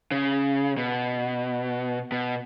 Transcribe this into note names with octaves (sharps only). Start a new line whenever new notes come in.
C#3
B2
B2